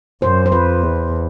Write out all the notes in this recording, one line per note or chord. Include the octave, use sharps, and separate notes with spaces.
F#2 C5
C5
F2 B4
E2